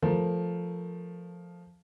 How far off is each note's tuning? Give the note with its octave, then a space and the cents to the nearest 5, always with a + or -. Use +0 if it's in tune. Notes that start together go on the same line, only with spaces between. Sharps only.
F3 +0 A3 +0 A#4 +0